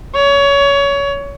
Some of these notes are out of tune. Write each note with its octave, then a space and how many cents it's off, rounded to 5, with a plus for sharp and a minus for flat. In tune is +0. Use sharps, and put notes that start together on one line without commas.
C#5 +25